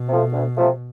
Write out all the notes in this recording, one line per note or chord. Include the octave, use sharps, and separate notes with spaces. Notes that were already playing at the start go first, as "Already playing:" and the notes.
Already playing: B2
C3 F3 A3
D2
C3 F3 A3